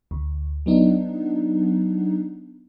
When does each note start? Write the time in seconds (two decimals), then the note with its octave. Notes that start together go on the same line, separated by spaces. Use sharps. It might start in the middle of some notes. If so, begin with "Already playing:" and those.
0.11 D2
0.66 F#3 B3 D4 D#4